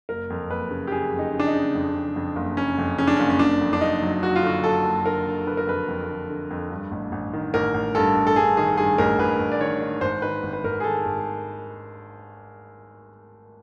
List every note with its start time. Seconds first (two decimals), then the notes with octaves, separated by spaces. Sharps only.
0.09 F#1 A#4
0.30 F2
0.51 F#1 B4
0.71 C#3
0.87 G4
0.92 C#3 G#4
1.13 F2
1.19 D#4
1.33 C#3
1.40 D4
1.47 D#4
1.54 C#3
1.75 F2
1.94 C#3
2.16 F2
2.36 F#1
2.57 F#1 C#4
2.78 F2
2.98 C#3 C#4
3.07 D4
3.17 F#1 C#4
3.30 C#4
3.39 F#1 D4
3.61 F2
3.73 D4
3.81 F#1 D#4
4.02 F#3
4.23 F#1 F#4
4.36 F4
4.43 D3 F#4
4.64 F#3 A4
4.84 F#1
5.06 D3 A#4
5.26 D3
5.47 D3 B4
5.57 A#4
5.67 F2 B4
5.88 F2
6.09 D3
6.30 D3
6.50 F2
6.70 G2
6.91 A1
7.12 A1
7.33 D#3
7.54 A1 A#4
7.74 A1
7.95 G2 A4
8.16 A1
8.27 A4
8.36 G2 G#4
8.57 D#3 G#4
8.77 G2 G#4
8.98 A1 A#4
9.18 A1 B4
9.40 A1
9.52 D5
9.60 D#3 C#5
9.81 D#3
10.01 G#1 C5
10.22 D#3 B4
10.43 G#1
10.53 B4
10.64 G#1 A#4
10.80 G#4
10.84 D#3 A4
11.05 G#1